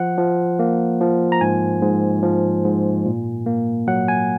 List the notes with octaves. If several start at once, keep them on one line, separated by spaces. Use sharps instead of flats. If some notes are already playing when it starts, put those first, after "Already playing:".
Already playing: F3 F#5
F3
A#3
F3
A#5
G#2 G#5
G#2
F3
G#2
A#2
A#3
F#3 F#5
G#5